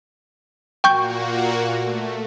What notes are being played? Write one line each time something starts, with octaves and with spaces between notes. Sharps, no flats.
A#2 A#3 F#4 G5 C#6 G6
A3